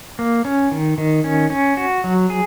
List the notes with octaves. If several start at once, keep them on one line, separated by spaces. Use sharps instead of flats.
A#3
C#4
D#3
D#3
C#4
C#4
F#4
F#3
G#4